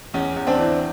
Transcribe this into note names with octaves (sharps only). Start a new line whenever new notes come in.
E2 C#4
E2
C4 D4
E3